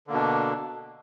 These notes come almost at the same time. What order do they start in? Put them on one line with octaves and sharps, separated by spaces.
D3 A#3 B2 D4